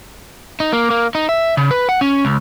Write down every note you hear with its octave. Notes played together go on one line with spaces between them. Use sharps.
D#4
A#3
A#3
D#4
E5
C#3
B4
F#5
C#4
C#2